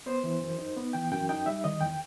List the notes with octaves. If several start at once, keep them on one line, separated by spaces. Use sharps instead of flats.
B3 C5
E3
F#2
D#4
B3
E3 G5
F#2 G5
D#4 G5
G3 E5
D#3 D#5
E2 G5